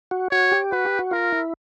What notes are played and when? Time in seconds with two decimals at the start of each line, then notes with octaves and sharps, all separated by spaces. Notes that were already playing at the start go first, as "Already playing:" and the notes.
0.11 F#4
0.31 F#4 C#5
0.52 G4
0.72 F#4 B4
0.85 G4
0.99 F#4
1.11 F4 A#4
1.32 E4